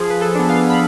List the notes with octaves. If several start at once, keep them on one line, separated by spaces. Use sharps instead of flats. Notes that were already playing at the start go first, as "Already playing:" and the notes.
Already playing: F3 G#4
B4
A4
B3 D4
F5
B5